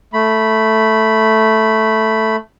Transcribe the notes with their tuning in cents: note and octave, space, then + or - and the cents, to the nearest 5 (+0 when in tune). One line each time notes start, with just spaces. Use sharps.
A3 +0 B5 +0